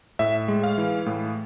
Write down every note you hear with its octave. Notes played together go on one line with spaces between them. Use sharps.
A2 E5
G#3
F5
E3
A2